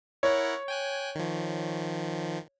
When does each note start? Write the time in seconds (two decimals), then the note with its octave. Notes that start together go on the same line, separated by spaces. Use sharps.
0.23 E4 A#4 C#5 F#5
0.68 G5 G#5 F#6
1.15 D#3 F3